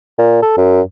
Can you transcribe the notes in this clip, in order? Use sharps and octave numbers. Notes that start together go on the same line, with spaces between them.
A#2
A4
F#2